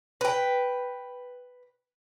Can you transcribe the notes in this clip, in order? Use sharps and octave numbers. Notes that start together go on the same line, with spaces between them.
B4 G5